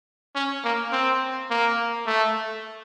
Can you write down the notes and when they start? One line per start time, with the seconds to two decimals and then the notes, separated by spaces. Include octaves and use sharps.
0.35 C#4
0.64 A#3
0.92 C4
1.50 A#3
2.06 A3